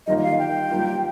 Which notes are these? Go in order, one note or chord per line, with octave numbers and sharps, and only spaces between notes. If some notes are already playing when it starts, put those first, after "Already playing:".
D#3 G3 A#3 F4 D#5
D#5
F5
G5
G3 A#3 F4